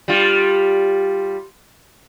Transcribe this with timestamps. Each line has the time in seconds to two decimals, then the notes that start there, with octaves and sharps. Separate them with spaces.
0.08 G3 F4